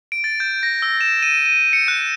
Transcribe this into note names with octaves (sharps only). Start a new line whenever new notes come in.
D7
A6
G6
A#6
E6
E7
D#7
D#7
C#7
F#6